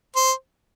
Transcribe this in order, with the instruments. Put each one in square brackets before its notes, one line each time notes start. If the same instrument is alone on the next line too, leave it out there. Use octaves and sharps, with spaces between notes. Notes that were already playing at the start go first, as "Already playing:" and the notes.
[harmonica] C5